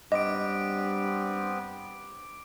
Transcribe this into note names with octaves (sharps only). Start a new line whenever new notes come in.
G2 B3 C4 B4 D#5 D6 D7